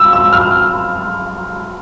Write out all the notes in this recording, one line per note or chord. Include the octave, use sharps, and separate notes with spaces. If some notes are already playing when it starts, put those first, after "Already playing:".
Already playing: E6
E6
F6